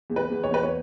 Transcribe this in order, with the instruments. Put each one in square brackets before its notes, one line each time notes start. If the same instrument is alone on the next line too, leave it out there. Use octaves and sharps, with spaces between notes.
[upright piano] E2
B4
E2
C#5
E2 B4
C#5